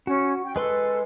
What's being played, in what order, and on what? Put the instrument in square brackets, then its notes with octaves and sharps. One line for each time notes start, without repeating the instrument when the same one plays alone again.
[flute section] C#4 [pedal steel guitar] F#4
[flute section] G5
[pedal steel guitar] G#3 B4 C6 [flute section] A4